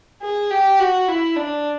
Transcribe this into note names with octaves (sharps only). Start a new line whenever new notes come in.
G#4
G4
F#4
E4
D4